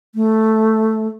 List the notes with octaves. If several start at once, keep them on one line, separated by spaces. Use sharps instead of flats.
A3